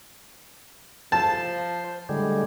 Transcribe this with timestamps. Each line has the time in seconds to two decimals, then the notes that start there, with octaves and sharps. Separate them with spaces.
1.12 F3 C5 A5
2.09 A2 D3 G3 G#3